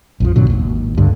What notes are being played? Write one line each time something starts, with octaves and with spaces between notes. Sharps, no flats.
A#1 F2 F3
G#2 B2 D3 F#3
G#1 D#2
C#2 G2 D3 G3